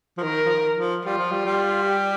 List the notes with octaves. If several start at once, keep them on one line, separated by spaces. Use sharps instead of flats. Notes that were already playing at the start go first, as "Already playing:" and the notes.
F3
D#3 A#4
F3
D#3
F3
G3 F4
F3
G3
G3
G4